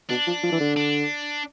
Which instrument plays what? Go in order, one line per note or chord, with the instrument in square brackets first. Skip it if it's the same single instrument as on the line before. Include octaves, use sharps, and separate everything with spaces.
[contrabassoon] B2 [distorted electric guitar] D4
[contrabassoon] F3
F3
E3
D3
[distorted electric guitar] D4